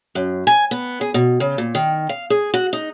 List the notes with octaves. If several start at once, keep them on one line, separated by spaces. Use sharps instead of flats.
F#2
G#5
B3
G#4
B2
C#3
A#2
D#3
F5
G#4
F#4
D#4